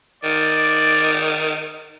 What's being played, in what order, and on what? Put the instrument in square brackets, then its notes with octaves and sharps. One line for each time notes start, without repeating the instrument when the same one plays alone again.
[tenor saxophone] D#3 [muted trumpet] D5